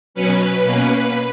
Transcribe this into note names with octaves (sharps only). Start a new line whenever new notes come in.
B2 F#3 C#4 B4
B2 A#3 C#4